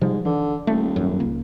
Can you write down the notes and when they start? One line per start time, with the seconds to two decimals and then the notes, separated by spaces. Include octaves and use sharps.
0.01 G#2 C3 F3 G3
0.25 D3 E3
0.67 D#1 A3
0.96 G#1 F#2
1.20 C#2 A#3